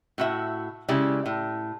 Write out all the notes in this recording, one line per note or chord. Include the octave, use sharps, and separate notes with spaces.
A2 F#4 E5
C#3 G#3 E4 G4 D5
A2